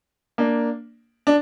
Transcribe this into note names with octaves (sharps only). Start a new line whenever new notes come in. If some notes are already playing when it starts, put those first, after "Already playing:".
A#3 D4
D4